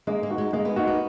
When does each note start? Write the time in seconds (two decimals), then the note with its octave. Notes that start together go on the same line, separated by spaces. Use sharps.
0.07 G#3 A#3
0.23 A#3
0.31 D#4 F#4
0.38 G#3
0.53 G#3 A#3
0.65 B3
0.76 A#3 D#4 F#4
0.88 B3